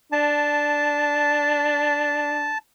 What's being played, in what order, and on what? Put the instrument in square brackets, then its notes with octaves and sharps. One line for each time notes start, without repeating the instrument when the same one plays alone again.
[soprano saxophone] D4 [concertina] A5